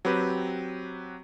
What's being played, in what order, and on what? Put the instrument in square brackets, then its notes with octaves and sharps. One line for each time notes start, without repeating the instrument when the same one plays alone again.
[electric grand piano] F#3 C4 G4 B4